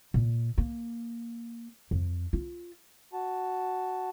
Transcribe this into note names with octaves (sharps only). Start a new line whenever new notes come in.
A#2
A#3
F2
F4
F#4 A5